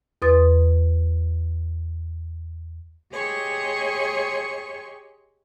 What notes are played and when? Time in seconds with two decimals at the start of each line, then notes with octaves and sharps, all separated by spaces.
0.22 E2 B4 C6 D#6 A6
3.13 G4 G#4 C#5 D#5 C6 C#6